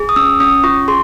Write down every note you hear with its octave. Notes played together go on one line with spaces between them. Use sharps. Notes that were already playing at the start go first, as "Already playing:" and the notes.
Already playing: G#4
D#6
C#4 E6
C#4 D#6
F4 C#6
G#4 C6